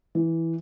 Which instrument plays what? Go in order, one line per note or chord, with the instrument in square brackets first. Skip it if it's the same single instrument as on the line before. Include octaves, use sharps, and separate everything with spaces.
[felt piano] E3